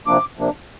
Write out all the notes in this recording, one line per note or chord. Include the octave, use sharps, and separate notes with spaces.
C3 F3 A#3 D4 D6
C3 F3 A#3 D4